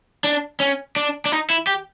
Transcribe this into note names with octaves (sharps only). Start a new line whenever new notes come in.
D4
C#4
D4
D4
D#4
E4
G4